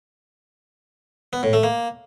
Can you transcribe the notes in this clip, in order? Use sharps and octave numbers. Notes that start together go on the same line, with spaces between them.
B3
A2
A3
A#3